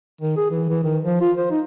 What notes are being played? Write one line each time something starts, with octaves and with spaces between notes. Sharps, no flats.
D#3
G#4
E3
E3
D#3
F3
F4
C5
D#4